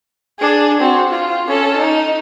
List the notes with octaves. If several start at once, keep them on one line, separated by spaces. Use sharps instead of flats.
D4 G#4
C4 F#4
F4
C#4 A4
D#4